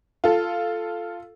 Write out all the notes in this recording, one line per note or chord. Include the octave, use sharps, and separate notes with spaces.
F4 A4